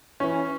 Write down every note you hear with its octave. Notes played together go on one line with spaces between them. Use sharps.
E3 C#4